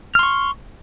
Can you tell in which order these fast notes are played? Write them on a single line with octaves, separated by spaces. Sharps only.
F6 C6 C#6